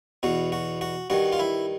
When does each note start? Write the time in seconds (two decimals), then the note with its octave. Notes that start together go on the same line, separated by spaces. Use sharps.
0.23 E2 B2 F#4
0.52 F#4
0.81 F#4
1.10 G2 D#3 F#4
1.32 F4
1.39 E4